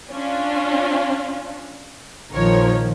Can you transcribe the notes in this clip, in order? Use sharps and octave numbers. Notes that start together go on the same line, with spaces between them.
C#4 D4 F4
A#1 D#3 F3 A#4 C#5